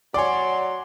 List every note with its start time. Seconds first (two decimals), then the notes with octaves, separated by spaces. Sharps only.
0.14 F#3 C#5 D5 G#5 C6 D6